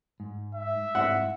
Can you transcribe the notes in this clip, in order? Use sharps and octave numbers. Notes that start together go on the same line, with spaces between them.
G#2
E5
G#2 C4 E4 F#5